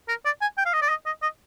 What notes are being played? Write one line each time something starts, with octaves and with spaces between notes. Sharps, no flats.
A#4
D5
G#5
G5
F5
D#5
D5
D#5
D#5
D#5